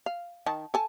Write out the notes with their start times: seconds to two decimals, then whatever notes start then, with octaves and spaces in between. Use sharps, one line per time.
0.06 F5
0.46 D#3 A5
0.74 A4 G#5 A5